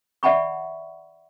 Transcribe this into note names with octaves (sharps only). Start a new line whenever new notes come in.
D5 E5 F#5 G#5 B5 C#6